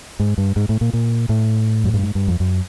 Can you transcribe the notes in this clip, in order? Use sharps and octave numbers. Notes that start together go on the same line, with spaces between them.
G#2
G2
G#2
A2
A#2
A#2
A2
F#2
G2
G#2
G2
F2
F#2